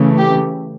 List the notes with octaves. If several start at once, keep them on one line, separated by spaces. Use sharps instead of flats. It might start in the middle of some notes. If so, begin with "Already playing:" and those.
Already playing: C#3 E3 A3
G4